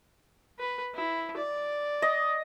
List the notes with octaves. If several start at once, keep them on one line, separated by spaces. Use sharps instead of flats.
B4
E4
D5
D#5